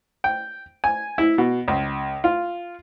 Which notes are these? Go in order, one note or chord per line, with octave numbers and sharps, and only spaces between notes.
G5
G#5
E4
B2
C#2
F4